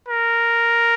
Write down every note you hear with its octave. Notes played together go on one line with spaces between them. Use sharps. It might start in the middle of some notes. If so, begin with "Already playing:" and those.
A#4